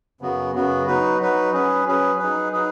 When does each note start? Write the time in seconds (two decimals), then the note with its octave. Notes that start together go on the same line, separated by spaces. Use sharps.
0.21 F#2 C#3 B3 F#4
0.54 F#2 C#3 B3 F#4
0.87 F#3 D#4 F#4 B4
1.21 F#3 D#4 F#4 B4
1.53 F#3 C#4 G#4 B4
1.86 F#3 C#4 G#4 B4
2.19 F#3 D#4 G#4 B4
2.52 F#3 D#4 G#4 B4